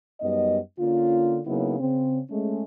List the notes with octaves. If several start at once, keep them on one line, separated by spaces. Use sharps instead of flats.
F#2 G3 B3 D#4 D#5
D3 A#3 C#4 F4
C#3 F#3 A#3 B3 D#4 E4
C#3 C4
G#3 A3 C#4